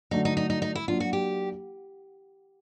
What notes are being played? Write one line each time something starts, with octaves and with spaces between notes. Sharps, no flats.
D3 F#3 A3 D4 D#4
D#4
D#4
D#4
D#4
E4
F#3 A#3 D4 F4
F#4
G4